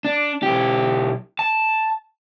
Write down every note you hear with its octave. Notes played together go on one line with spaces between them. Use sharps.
D4
B1 G4
A5